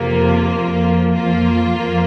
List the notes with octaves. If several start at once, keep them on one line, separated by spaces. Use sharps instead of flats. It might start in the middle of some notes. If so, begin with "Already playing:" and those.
Already playing: F2 C3 A#3 F4
F2 F3 A#3
F2 F3 A#3 F4
F2 F3 A#3